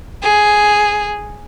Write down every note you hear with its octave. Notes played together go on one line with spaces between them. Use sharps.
G#4